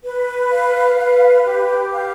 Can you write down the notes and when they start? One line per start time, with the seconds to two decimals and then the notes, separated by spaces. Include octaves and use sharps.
0.04 B4
0.51 F5
0.97 B4
1.45 G4
1.92 F5